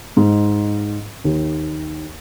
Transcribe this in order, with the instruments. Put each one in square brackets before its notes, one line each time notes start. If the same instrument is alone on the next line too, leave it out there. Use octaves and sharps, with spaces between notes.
[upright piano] G#2
D#2